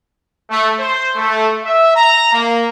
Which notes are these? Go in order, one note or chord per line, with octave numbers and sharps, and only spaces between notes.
A3
C5
A3
E5
A#5
A#3